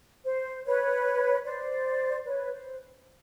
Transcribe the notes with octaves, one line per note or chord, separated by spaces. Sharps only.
C5
B4 C#5
C5 D5
B4 C#5
C5